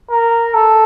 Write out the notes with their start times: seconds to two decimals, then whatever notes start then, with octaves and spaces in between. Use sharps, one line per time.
0.10 A#4
0.54 A4